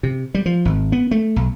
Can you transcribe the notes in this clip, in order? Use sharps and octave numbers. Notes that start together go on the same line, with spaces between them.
C3
G3
F3
G#1
B3
A3
B1